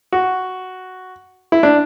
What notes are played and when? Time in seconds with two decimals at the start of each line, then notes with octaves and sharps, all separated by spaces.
0.12 F#4
1.52 E4
1.63 D4